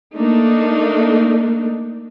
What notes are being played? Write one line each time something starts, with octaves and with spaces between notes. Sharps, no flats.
A3 A#3 D4 D#4